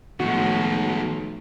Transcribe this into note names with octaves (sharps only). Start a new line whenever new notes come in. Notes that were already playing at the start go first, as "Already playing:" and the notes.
B1 A2 D#3 F3 G#3 F#4